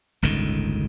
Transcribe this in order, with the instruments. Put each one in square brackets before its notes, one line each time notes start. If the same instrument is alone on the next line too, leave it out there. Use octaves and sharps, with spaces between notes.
[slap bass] G1 C#2 A2 D#3